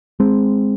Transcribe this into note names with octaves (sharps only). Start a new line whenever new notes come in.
G#3 C4